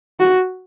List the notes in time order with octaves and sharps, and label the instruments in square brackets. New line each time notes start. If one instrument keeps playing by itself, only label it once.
[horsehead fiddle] F#4